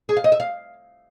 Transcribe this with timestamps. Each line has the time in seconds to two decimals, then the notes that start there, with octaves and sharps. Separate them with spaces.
0.09 G#4
0.17 F5
0.24 D#5
0.32 E5
0.40 F5